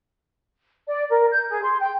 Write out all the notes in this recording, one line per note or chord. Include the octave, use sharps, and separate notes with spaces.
D5
A#4
G6
G#4
C6
G5